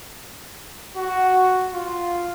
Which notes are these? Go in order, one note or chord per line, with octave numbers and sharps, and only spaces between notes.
F#4
F4